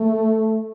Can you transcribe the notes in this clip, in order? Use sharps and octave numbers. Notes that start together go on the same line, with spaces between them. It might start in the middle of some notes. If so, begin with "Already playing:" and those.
Already playing: A3